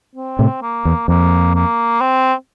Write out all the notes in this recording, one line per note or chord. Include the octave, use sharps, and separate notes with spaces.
C4
A2 C3
A#3
E2
F2 A#3
A#3
C4